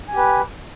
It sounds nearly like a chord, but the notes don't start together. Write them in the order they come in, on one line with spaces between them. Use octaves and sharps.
G#5 G4 B4